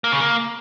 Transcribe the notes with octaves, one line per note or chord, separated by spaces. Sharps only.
A#3
C#3
A#3